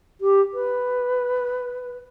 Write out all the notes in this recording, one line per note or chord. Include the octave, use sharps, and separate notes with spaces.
G4
B4